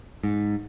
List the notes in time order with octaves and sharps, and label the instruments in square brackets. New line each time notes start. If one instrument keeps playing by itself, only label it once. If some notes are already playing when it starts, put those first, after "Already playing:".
[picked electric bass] G#2